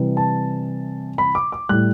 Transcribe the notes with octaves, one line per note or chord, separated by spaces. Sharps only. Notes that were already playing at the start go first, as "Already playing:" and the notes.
Already playing: C3 E3 G3
A5
B5
D6
D6
A2 G3 F#6